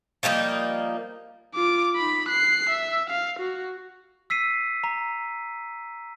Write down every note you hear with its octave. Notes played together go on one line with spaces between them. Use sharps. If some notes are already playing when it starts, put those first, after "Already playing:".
F3 G3 A#3 D#4
F4 D6
D#4 B5
F#6 C7
E5
F5
F#4
E6 B6 C7 D#7
A#5